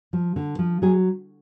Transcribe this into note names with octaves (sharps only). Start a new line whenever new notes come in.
F3
D3
F3
F#3 G#4